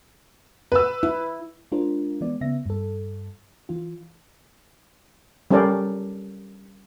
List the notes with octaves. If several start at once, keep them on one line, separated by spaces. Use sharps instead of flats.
B4 E6
E4
G#3 D4 F4 A#4 C5
E3 G#3 B3 D5
C#3 B3 E5 A#6
G2 A4
E3 F4
G3 C#4 A4 A#4 C5 D5